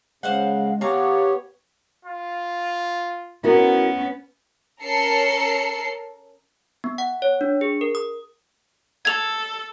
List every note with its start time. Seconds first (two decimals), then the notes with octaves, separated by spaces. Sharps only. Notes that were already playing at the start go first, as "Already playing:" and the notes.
0.23 C#3 G#3 C5 F5 F#5
0.81 D3 B3 G4 C#5 F5 A#5
2.05 F4
3.44 B3 C#4 E4 F#4 A#4
4.82 C#4 A4 A#4 C7 C#7
6.84 B3
6.98 F#5
7.22 C#5
7.41 D4
7.61 G#4
7.81 A#4
7.95 D#6
9.05 A4 G#6 F7